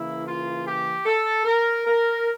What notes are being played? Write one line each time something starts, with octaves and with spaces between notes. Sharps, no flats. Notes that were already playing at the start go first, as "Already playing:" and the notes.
Already playing: C#3 E3 A#3 E4
F4
G4
A4
A#4
A#4